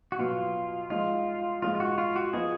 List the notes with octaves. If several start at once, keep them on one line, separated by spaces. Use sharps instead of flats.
F#4
B2 F#3 B3 F4
F3 G#3 D#4 F4
F3 G#3 D#4 F4
F4
F#4
F4
F#4
F3 B3 F4 G#4 B4 D#5